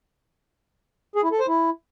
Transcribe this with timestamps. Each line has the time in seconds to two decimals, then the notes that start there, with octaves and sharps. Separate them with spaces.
1.16 G#4
1.24 E4
1.32 A4
1.40 C5
1.48 E4